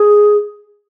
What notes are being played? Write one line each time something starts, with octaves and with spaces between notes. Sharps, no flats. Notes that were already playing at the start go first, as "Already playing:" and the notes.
Already playing: G#4